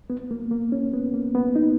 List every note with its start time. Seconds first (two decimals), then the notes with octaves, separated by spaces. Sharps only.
0.10 B3
0.31 A#3
0.51 A#3
0.72 C#4
0.94 B3
1.14 A#3
1.35 B3
1.56 D#4